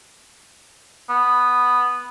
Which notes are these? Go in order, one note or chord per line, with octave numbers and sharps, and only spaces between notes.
B3